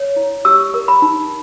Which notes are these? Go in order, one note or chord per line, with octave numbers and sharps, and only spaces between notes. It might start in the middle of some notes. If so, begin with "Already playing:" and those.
Already playing: C#5
E4
G4 E6
A#4
B5
D#4